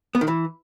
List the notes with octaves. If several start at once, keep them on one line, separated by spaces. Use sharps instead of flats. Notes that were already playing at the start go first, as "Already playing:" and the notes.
B3
D#3
E3